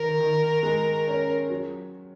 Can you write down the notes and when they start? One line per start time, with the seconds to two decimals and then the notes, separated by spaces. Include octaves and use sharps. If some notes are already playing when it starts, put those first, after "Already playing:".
Already playing: D#3 A#4
0.20 D#3
0.63 G#3
1.07 C#4
1.50 F#3